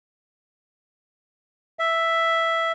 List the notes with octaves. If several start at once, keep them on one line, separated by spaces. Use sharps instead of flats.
E5